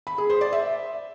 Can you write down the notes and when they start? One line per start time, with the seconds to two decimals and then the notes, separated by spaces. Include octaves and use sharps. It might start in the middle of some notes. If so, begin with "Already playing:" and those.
0.07 B5
0.18 G#4
0.30 C5
0.41 D5
0.53 E5